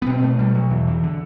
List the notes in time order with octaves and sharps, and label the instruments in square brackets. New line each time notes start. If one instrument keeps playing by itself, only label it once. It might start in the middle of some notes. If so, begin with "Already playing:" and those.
[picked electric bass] B3
B2 C4
A3
B2 G3
F#3
E2 E3
E3
D3